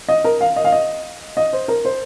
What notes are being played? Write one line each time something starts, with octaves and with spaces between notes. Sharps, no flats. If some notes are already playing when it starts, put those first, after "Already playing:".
D#5
A#4
F5
D#5
F5
D#5
D#5
C5
A#4
C5